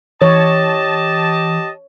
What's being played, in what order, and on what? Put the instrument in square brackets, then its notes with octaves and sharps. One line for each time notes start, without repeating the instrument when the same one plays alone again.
[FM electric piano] E3 [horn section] G4 D#5 A5 [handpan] C#5